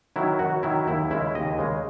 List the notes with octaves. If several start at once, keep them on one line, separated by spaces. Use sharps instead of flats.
D#3 F#3 E4
F#2 F#4
D#3 F#3 E4
D#2 E4
C#3 G#3 E4
D#2 D#5
C#3 G#3